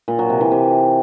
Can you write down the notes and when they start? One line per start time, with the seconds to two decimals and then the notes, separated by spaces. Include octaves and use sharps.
0.08 A#2
0.19 F#3
0.30 C3
0.41 E3
0.52 C3